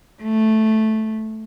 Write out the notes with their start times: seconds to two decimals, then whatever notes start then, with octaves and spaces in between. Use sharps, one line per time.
0.22 A3